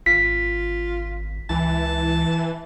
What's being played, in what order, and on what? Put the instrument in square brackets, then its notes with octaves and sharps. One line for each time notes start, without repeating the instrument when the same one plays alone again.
[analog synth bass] G#1 [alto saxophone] F4 [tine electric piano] B6
[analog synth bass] C#2 [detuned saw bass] E3 [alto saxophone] A5